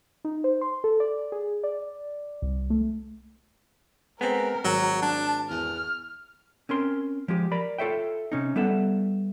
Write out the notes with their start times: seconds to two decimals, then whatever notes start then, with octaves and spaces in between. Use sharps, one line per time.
0.25 D#4
0.44 C5
0.61 C6
0.84 A4
1.00 D5
1.32 G#4
1.64 D5
2.42 C2
2.70 A3
4.21 G#3 B3 C4 A#4
4.64 G#1 F#3
5.02 D4 A5
5.50 E2 F6
6.69 C4 C#4 A#4 C6
7.28 F3 G#3 G4
7.52 A#4 D5 B5
7.79 F4 A4 C#5 E5 G5
8.32 C3 C#4 D#4
8.56 G3 B3 A4 E5 F#5